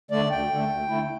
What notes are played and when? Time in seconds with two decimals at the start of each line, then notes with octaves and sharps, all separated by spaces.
0.11 D3 A3 D5
0.31 D2 G5
0.50 D3 A3
0.69 D2
0.88 D3 A3 E4